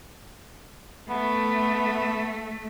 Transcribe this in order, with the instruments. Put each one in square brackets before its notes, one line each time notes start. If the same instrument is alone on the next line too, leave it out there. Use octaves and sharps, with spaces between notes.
[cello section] A3 [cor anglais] B3